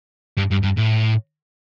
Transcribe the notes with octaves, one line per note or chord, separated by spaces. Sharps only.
G2
G2
G2
A2